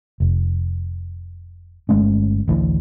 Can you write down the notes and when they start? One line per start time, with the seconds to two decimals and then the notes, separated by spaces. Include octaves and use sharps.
0.20 F1
1.89 G1 G#3 A3 C#4
2.48 A1 D2 E3